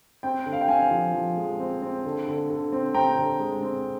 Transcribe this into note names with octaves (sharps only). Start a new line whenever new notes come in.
C4 G5
D3
F5
G5
C4 F5 G#5
F3
F3
G#3
C4
C4
D3
D3
D3
C4
C4 G5 A#5
D3
G#3
C4